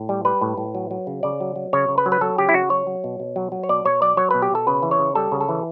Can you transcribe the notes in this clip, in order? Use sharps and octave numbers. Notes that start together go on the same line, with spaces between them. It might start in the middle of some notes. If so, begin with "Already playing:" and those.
Already playing: A2
G3
G3 B4
A2
A2
F#3
F#3
C#3
C#3 D5
F#3
F#3
C#3 C#5
C#3
B4
F#3
B4
F#3 A4
C#3 G4
E4
C#3 F#4
F#3 C#5
F#3
B2
B2
F#3
F#3
C#5
B2 D5
B2 C#5
F#3 D5
F#3 C#5
B2 B4
G4
B2 A4
C#3 B4
E3
C#5
C#3
G3 A4
C#3
A4
E3